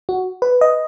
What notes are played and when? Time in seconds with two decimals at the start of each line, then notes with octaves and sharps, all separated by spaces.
0.09 F#4
0.42 B4
0.61 D#5